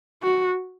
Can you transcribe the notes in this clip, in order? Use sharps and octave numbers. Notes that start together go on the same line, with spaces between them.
F#4